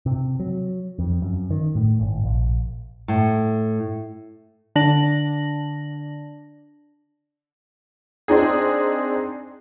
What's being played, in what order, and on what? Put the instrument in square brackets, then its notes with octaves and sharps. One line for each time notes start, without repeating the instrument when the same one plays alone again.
[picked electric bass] C3
F#3
F2
F#2
D#3
A2
G#1
A#1
[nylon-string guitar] A2
[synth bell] D3 D4 D5 A5 A#6 F#7
[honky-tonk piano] C4 D4 D#4 G#4